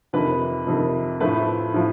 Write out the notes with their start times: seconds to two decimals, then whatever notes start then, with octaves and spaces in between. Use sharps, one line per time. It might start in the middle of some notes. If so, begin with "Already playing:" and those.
0.13 F2 C3 D#3 B4
0.67 F2 C3 D#3
1.20 A2 F3 A3 B4
1.74 A2 F3